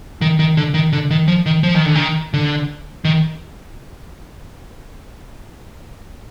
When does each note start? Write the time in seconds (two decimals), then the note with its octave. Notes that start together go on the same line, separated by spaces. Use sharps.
0.21 D#3
0.39 D#3
0.57 D3
0.74 D#3
0.93 D3
1.11 D#3
1.28 F3
1.46 D#3
1.63 F3
1.75 D#3
1.85 D3
1.95 D#3
2.34 D3
3.05 D#3